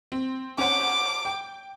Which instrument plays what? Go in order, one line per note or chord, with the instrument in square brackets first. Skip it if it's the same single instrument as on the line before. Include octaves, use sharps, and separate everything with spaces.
[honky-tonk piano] C4
[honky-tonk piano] C#4 C5 F#5 [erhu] D6
[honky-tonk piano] G5